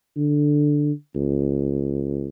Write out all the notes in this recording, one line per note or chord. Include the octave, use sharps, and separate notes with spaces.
D3
C#2